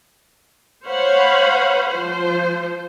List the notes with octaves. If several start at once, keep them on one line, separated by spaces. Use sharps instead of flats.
C5 C#5 F5 F#5 B5
F3 C5